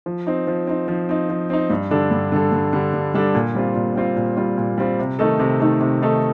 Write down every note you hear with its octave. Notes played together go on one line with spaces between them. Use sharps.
F3
C4 D#4
F3
C4 D#4
F3
C4 D#4
F3
C4 D#4
G2
D3 G3 D4 A4
G2
D3 G3 D4 A4
G2
D3 G3 D4 A4
G2
D3 G3 D4 A4
A#2
G3 C4 F4
A#2
G3 C4 F4
A#2
G3 C4 F4
A#2
G3 C4 F4
C3
D#3 A3 D#4 A4
C3
D#3 A3 D#4 A4
C3
D#3 A3 D#4 A4